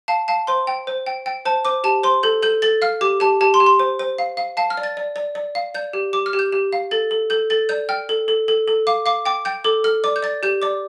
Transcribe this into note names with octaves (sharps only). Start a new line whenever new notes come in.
F5 A5
F5 A5
C5 C6
G5
C5
G5
G5
C5 A5
C5 D6
G4 A5
C5 C6
A4 G6
A4 G6
A4 A6
F5 F6
G4 D6
G4 A5
G4 A5
C6
G4
C6
C5
C5
F5
F5
F5 A5
F6
D5
A6
D5
D5
D5
F5
D5 G6
G4
G4 D6
F6
G4
G6
G4
F5
A4 A6
A4
A4 G6
A4 A6
D5 G6
G5 F6
A4
A4
A4
A4
F5 D6
F5 D6
G5 D6
G5 G6
A4 D6
A4 F6
D5 D6
G6
D5 A6
G4 G6
D5 D6